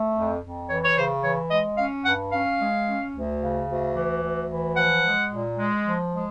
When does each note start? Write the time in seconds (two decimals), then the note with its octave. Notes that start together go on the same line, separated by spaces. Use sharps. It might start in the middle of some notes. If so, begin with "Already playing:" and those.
Already playing: A3
0.15 F2
0.42 F2
0.69 E3 C#5
0.84 C#5
0.96 C#3 C5
1.23 E3 C#5
1.50 G#3 D#5
1.77 C#4 F5
2.04 G2 F#5
2.31 C#4 F5
2.59 G#3
2.85 C#4
3.14 D2
3.40 C#3
3.68 D2
3.94 E3
4.21 D2
4.49 E3
4.76 F3 F#5
5.03 G#3
5.29 A#2
5.58 G#3
5.84 F3
6.12 G#3